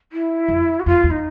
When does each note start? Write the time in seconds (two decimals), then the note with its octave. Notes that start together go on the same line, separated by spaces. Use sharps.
0.12 E4
0.49 F2
0.79 F#4
0.86 F2 F4
1.04 E2
1.10 D#4